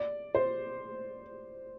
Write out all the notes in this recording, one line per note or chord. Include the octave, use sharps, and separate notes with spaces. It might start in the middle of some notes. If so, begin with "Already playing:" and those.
Already playing: D5
C5